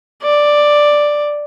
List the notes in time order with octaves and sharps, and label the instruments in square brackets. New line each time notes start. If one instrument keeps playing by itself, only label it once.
[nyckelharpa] D5